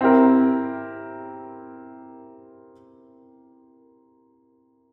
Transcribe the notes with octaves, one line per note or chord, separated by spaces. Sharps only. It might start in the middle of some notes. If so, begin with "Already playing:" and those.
C4 E4 G4 A#4